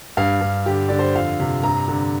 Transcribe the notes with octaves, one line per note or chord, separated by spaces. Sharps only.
G2 F5
G2
D3 G4
D3 D5
C5
F2 F5
C3
G2 A#5
D3